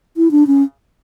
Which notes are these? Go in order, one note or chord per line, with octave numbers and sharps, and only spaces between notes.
E4
D4
C#4